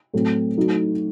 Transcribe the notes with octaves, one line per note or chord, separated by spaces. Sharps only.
A2 F#3 A3 C4
F#3 A3 D#4 F#4